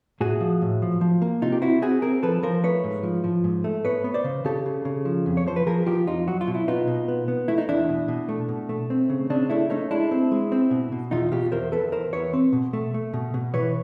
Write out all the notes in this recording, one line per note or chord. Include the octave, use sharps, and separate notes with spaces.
A2 F#4 G#4
F3
A2
F3
F3
A#3
C3 D#4 F4
G4
C4 E4 F#4
C4 F#4 G#4
C4 G#4 A#4
F3 A4 B4
F3 A#4 C5
A3 B4 C#5
G#2
F3
F3
G#2
A3
B3 B4 C#5
B3
C5 D5
C#3
C#3 G4 A4
C#3
C#3
F3
F2
C#5
F3 C5
B4
F3 G#4 A#4
F3 F4 G4
F2 D#4 F4
F#3 F#4
F4
B2
E4
B3 D#4 F4
B2
B3
B3
A3 E4
D#4
E2 D4 E4
B2
B2
A3
B2
A3
C4
C#3
C#3 C4 D4
A3 D4 E4
A3 C#4 D#4
G#3 D4 E4
C4
G#3
C4
B2
B2
E2 D#4 F4
B2 F4 G4
E2 A#4 C5
E2 A4 B4
E2 A#4 C5
E2 B4 C#5
C4
B2
A3
A3
B2
B2
E3 B4 C#5